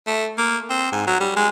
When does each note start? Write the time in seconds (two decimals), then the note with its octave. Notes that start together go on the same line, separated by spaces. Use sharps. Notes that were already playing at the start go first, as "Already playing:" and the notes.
0.07 A3
0.38 A#3
0.70 C4
0.92 G#2
1.07 F#3
1.20 G3
1.36 G#3